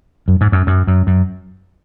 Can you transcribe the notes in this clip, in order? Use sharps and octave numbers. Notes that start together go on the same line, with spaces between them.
F#2
G#2
F#2
F#2
F#2
F#2